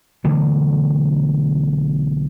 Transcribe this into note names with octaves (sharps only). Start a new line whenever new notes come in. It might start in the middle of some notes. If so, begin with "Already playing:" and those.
B1 D3 E3 A3